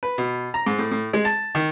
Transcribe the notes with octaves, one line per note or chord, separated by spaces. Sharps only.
B4
B2
A#5
G#2
A2
A2
G#3
A5
D#3